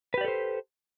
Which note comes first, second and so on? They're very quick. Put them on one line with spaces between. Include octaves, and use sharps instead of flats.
B4 G4 D5 A4 C5